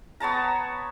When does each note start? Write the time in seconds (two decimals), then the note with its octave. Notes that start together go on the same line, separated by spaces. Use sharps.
0.20 B3 C#5 A5 A#5